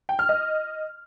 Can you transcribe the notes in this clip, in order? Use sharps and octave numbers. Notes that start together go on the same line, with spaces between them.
G5
F6
D#5